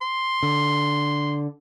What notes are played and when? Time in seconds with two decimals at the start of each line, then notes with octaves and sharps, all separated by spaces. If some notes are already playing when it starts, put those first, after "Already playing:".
0.02 C6
0.43 D3